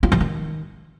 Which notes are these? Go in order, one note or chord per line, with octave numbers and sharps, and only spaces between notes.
F4
E3
D#3